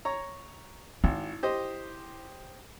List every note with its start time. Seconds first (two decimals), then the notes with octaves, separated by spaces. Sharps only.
0.05 C#5 A#5
1.04 G#1 E4
1.43 G4 C5 D#5